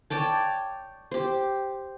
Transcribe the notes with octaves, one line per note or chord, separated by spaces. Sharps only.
C#5 D5 G5 A5
G4 C5